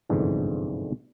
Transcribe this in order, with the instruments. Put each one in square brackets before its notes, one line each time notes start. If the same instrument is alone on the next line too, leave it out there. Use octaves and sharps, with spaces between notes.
[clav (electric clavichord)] G1 C2 F2 G#2 D3 E3